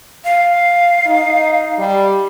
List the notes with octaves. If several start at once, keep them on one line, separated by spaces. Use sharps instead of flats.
F5
D#4
G3